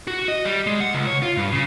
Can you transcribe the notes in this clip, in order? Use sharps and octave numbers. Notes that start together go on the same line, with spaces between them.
F#4
D#5
G3
G#3
F#5
C#2
C#5
F4
G2
C#3